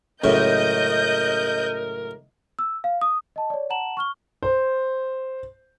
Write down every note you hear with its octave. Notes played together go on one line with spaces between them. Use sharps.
C#2 F#2 A2 A#4 D#5 G6
E6
F5
D#6
D#5 A5
C#5 D5
F#5 A5 A#5 E7 F#7
C#6 F6 G7
C5